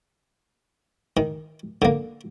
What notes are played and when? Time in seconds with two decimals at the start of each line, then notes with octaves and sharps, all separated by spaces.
1.17 D#3
1.82 D3 A#3